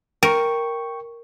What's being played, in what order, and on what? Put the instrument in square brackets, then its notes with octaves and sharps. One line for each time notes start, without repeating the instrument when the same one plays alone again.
[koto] A#4 [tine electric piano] G5 C#6